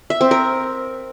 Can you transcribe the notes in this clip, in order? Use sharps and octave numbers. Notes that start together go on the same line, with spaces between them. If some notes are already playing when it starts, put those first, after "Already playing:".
E5
C4
A#4